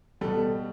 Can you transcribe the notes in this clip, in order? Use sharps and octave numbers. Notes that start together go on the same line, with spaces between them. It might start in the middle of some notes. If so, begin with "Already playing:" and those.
B2 G3 A4